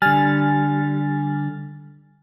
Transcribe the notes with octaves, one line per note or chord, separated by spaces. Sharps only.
D3 G3 G#5 F6 A6